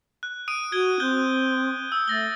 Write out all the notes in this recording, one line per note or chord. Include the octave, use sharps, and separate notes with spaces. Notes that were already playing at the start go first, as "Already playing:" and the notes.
F#6
D#6 D7 D#7
F#4 G#6 D7 G7
C4 F#6 G6 G7
E6
A3 A6 A#6 G7